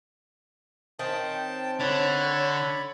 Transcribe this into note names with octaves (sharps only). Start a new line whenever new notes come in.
D#3 C4 C#4 G5 A5
D3 C#5 D5 B5